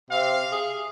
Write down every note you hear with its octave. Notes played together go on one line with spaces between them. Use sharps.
C3 F5
G#4